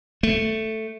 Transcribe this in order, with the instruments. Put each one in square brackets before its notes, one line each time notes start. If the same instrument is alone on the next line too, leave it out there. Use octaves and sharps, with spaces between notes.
[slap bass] A3